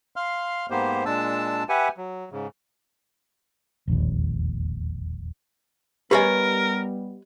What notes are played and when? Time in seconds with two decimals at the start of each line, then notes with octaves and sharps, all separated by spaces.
0.16 F5 C6 F6
0.70 G#2 A#3 B3 G4 C5
1.06 A#2 G#3 D4 A5 E6
1.69 G4 B4 E5 F#5 G#5
1.97 F#3
2.32 G#2 C#3
3.87 E1 A#1 D#2
6.11 G3 B3 G4 A#4 B4 C#5 D#5 G#5